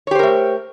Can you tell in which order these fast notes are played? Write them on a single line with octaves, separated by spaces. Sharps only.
C#5 G4 C5 A#4 A3